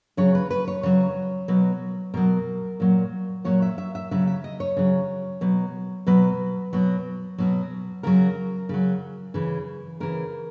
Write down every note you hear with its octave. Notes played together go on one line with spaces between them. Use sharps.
C#3 F#3 C#5
B4
B4
C#5
C#3 F#3 C#5
B2 F#3
B2 F#3 A#4
A#2 F#3
A#2 F#3 C#5
E5
E5
E5
C#3 F#3 E5
E5
D#5
C#5
C#3 F#3
B2 F#3
B2 F#3 B4
B2 F#3
B2 F#3
C#3 F#3 A#4
C#3 F#3
C#3 E3
C#3 E3 A#4